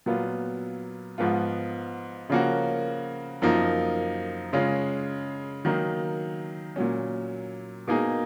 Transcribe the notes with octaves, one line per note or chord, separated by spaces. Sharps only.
A#2 F#3 B3 F4
G#2 F3 B3 F4
C#3 F3 A#3 C#4 F#4
F#2 F3 A#3 D#4
C#3 G#3 C#4 F4
D#3 F#3 A#3 D#4
A#2 F#3 C#4
B2 A#3 D#4 G#4